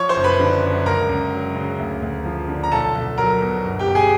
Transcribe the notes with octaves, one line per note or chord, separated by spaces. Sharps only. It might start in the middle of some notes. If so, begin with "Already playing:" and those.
Already playing: F3 C#5 C#6
C5 C6
F#1
B4 B5
D3
F#2
C#2 A#4 A#5
C#2
F#3
C#3
D2
D2
F3
D3
A#5
B1 A4 A5
B1
F#3 A#4 A#5
B2
G1
G4 G5
G1
G#4 G#5